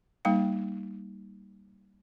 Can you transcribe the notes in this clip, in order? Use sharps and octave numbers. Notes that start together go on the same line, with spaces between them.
G3 A#3 D#4 F5 G5